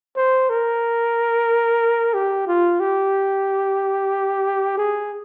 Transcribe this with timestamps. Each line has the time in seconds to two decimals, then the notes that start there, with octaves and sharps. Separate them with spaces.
0.17 C5
0.49 A#4
2.14 G4
2.47 F4
2.80 G4
4.77 G#4